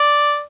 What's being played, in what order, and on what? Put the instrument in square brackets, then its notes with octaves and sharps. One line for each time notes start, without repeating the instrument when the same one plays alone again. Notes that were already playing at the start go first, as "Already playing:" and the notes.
Already playing: [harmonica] D5